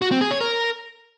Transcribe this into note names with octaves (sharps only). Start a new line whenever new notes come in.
F#4
C4
G#4
C#5
A#4